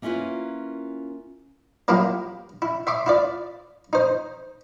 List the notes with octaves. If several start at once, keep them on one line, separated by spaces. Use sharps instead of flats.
A#3 C#4 E4 F4 A#4 B4
F#3 A#3 E4 F4 G4
E4
E5 C6 D6
E4 F4 D5
D#4 C5